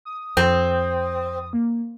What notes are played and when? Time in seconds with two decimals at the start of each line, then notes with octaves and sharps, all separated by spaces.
0.05 D#6
0.37 F2 C4
1.53 A#3